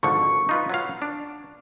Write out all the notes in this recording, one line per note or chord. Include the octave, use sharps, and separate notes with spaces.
G#1 D3 F3 C#6
D#4 F4 B4
F#3 B4 F5
D4